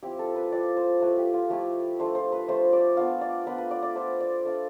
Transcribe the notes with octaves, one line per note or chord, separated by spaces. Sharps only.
F3 C4 E4 G4
A4
B4
F3 C4 E4 D5
C5
F3 A3 E4 B4
G4
F4
F3 A3 E4 G4
F3 A3 D4 C5
C5
B4
F3 A3 D4 C5
D5
B3 D4 F4 F5
D5
B3 D4 F4 B4
B4
D5
D5
A3 D4 F4 C5
D5
A3 D4 F4